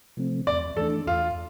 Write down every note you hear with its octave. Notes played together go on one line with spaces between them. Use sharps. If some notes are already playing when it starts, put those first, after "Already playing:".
C3 F3 A3 C4
E2 D5
E3 A3 D4 A4
E2 F4